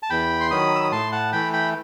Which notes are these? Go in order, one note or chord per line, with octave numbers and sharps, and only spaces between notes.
A5
E2 G5 B5
C6
D#3 F#3 B5 D#6
E6
D#6
A2 A5 C6
F#5 A5
E3 A3 G5 B5
G5 B5